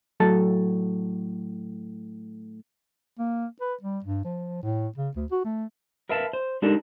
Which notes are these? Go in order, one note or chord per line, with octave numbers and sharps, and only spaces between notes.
A2 F#3 A4 A5
A#3
B4
G3
G2
F3
A2
C#3
D2
F#4
A3
A#4 B4 E5 F5 A5
C5
G#3 D4 D#4 G4 A4 A#4